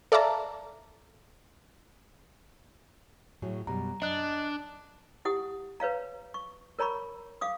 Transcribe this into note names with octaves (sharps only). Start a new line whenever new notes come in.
A4 D5 E5 F5 A5 A#5
A2 F#3 G#4
F#2 B2 G3 A#5
F#2 D4 D#5 F#6
E4 G4 F#5 D#6
B4 C#5 F5 A#5
C#6
A#4 C#5 A#5 B5 C#6
F5 D6 D#6